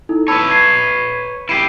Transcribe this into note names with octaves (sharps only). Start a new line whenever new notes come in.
D#4 E4 A4
B4 C#5 A5 B5 E6
G#6 C7
E4 G4 C7 D7 D#7